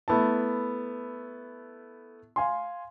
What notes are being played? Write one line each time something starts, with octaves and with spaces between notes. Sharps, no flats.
A3 B3 E4 A5
F5 G#5 C6